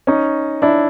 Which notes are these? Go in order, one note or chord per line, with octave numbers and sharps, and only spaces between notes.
C#4 D#4
D4 E4